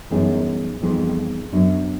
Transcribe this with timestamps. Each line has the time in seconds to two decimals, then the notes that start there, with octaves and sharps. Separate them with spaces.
0.11 F#2 E3 G3 B3 D#4 G#4
0.81 F2 E3 G3 B3 D#4 G#4
1.52 F#2 F#3 B3 D4